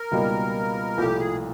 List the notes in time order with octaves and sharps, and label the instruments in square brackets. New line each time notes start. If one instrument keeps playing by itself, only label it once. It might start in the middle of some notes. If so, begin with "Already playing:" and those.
Already playing: [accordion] A#4
[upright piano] C#2 B2 G3 A#3 D#4
[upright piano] C2 A#2 F3 A3 [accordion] G4
[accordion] G#4